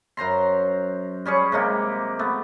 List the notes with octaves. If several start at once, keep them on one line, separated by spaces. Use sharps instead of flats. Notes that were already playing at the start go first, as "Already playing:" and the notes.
F#2 C5 A#5 C6
G3 C#4 G#4 C#6
C3 G#3 A#3 G4
A3 B3